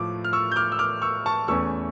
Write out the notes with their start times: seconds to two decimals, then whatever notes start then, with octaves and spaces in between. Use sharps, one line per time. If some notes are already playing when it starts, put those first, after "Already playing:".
Already playing: A2 F3 A3 D6
0.24 F6
0.33 C#6 E6
0.52 G6
0.56 D6 F6
0.72 E6
0.79 D6 F6
1.02 C#6 E6
1.26 A5 C#6
1.48 E2 E3 A3 C#4 C#6 E6